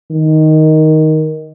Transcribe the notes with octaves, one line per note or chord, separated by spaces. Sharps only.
D#3